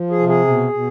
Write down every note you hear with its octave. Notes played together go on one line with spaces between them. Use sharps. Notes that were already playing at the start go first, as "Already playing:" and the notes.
Already playing: F3
G#4
C3
G#4
B2
B2